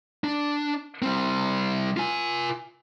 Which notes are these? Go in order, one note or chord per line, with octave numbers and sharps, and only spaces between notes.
D4
G3 C4
F4 G#5